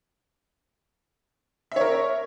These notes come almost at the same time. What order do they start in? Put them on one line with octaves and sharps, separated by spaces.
E5 C#5 A#4